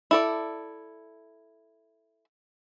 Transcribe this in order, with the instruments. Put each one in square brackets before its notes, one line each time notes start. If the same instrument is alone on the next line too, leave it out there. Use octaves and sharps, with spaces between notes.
[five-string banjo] E4 A4 D5